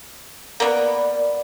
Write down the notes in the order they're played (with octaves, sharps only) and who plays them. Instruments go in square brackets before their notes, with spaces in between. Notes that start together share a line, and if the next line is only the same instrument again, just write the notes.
[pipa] A#3 B3 [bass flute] D5